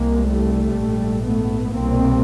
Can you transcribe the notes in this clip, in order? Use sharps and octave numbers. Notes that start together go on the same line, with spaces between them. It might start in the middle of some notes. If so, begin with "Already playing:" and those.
Already playing: C2 C3 G#3 A#3
G3 A3
A#1 G#2
A3 B3
C2 B2 A#3 C4